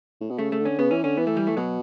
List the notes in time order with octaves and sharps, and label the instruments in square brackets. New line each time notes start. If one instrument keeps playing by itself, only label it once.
[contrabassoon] A2
B2
[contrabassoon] C#3 [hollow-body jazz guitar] A3
[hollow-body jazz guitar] A3
[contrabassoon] D3
[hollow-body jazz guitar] C#4
[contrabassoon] C#3 [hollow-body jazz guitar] B3
[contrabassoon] E3 [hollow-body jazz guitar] C#4
[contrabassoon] D3 [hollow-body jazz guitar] C#4
[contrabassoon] E3 [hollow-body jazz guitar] B3
[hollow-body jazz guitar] A3
G3
A3
[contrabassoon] B2 [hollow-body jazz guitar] F#3